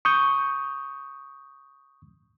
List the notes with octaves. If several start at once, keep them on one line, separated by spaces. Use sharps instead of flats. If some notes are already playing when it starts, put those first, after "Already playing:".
C#6 D#6 G6